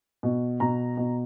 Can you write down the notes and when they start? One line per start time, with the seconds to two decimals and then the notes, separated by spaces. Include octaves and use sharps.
0.23 B2
0.60 B2 A#5
0.97 B2